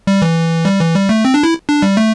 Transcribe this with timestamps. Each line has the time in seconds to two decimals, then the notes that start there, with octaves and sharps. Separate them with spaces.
0.07 G3
0.22 E3
0.65 G3
0.80 E3
0.94 G3
1.09 A3
1.25 C4
1.34 D4
1.43 E4
1.69 D4
1.82 G3
1.97 A3